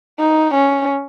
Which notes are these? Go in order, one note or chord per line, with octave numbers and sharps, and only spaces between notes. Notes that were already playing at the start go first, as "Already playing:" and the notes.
D#4
C#4